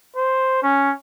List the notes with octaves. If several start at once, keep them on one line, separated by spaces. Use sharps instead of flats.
C5
C#4